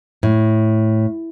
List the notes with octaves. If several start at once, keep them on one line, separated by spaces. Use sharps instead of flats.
A2